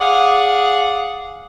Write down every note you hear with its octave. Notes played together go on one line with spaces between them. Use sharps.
G#4 D5 F5 F#5